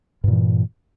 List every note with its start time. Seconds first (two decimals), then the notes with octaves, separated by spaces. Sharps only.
0.24 G2
0.28 A#2
0.32 E3